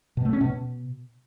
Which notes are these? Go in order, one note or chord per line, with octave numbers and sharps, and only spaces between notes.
B2
A3
C#4
B2